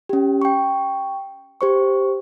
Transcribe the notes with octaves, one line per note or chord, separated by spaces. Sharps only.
C#4 G4
G5 C#6
G4 C5 C#6